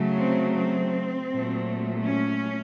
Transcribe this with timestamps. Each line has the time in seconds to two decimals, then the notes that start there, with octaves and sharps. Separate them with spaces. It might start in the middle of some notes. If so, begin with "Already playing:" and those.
Already playing: C#3 F#3 A3
0.17 C4
0.55 C4
1.30 A#2 F#3 A3
2.04 C#4